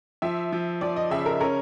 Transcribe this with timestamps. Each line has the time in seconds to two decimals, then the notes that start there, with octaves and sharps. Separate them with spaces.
0.22 F3 E5
0.52 F3
0.81 F3 D5
0.96 D#5
1.10 C#3 E5
1.26 A#4
1.40 C#4 A#4